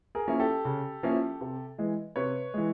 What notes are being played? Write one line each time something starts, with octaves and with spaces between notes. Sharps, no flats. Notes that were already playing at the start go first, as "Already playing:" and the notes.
G#4 A#4
F3 A#3 C#4 E4
G4 A4
C#3
F3 A#3 C#4 E4
C3
E3 G#3
C3 B4 C#5
E3 G#3